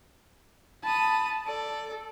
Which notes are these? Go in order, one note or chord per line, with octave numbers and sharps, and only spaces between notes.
A5 B5 D#6
A4 D5